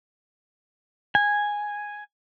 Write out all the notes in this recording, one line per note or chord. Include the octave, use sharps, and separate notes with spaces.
G#5